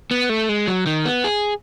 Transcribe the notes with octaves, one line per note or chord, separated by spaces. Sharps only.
B3
A3
G#3
F#3
D#3
B3
G#4